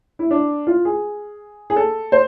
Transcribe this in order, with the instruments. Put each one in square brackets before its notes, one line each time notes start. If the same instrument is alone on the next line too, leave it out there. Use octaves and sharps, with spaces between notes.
[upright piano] E4
D4
F4
G#4
G#4
A4
C5